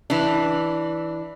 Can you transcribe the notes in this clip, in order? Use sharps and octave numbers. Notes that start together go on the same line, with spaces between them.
E3 D4